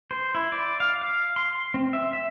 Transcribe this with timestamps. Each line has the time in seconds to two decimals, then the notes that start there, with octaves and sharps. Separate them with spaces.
0.11 C5
0.35 E4
0.52 D5
0.80 F5
1.02 F5
1.36 C6
1.74 C4
1.93 E5
2.13 E5